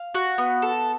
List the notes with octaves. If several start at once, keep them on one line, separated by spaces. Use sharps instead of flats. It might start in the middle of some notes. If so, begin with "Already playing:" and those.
Already playing: F5
F#4
B3
A4